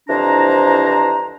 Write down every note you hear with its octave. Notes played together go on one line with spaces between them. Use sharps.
C2 F2 E3 D4 C5 A#5